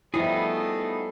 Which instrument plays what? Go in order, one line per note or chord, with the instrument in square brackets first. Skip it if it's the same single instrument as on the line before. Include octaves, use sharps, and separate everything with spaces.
[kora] F3 G3 [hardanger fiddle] A3 [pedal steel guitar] B3 D#4 G#4 [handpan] E4